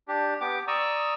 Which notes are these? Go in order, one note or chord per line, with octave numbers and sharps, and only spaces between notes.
D4 G4
B3 G4 D6
D5 A#5 C#6 D#6 E6